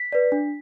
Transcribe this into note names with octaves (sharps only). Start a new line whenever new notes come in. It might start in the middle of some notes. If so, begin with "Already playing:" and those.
Already playing: B6
B4 D5
D4